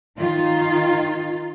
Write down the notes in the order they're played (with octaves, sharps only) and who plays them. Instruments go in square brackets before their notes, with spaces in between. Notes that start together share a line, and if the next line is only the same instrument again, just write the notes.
[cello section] D#3 D#4 F4